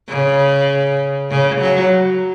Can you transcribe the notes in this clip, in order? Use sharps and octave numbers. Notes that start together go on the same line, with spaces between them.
C#3
C#3
F#3